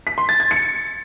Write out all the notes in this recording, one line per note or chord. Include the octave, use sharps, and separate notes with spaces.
B6
C6
A6
G#6
C#7